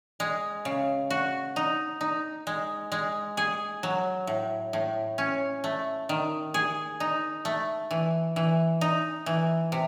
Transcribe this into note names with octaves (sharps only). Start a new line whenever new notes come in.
G#3
C#3
F#4
D#4
D#4
G#3
G#3
G#4
F#3
A2
A2
C#4
A3
D#3
G#4
D#4
A3
E3
E3
D#4
E3
C3